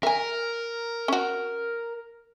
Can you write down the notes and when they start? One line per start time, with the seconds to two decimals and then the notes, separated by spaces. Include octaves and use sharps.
0.03 A#4 E5 G#5
1.08 C#4 F#4